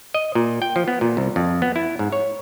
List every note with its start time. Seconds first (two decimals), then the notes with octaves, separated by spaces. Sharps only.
0.14 D#5
0.35 A#2
0.62 G5
0.76 F3
0.88 B3
1.01 A#2
1.17 C2
1.36 F2
1.62 B3
1.76 E4
1.99 G#2
2.12 C#5